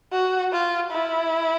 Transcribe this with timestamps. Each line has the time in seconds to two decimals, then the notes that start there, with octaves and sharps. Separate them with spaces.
0.12 F#4
0.53 F4
0.91 E4